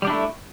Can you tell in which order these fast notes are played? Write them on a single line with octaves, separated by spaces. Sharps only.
G3 G4 D4 E4 A3